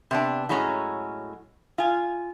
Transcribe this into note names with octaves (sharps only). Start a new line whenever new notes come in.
C3 B3 D4
A2 F#3 G#3 C#4 A#5
F4 G#5